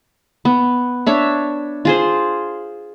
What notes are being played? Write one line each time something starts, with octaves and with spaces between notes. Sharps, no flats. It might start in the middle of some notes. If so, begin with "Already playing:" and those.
B3
D4 C#5 E5
F4 G#4 C5